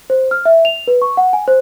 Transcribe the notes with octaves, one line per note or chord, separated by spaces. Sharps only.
C5
F6
E5
F7
B4
C#6
F#5
G#5
C5